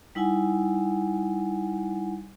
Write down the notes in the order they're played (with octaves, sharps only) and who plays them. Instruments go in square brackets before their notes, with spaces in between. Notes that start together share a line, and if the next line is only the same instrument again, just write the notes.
[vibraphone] G3 D#4 E4 F#5 G#5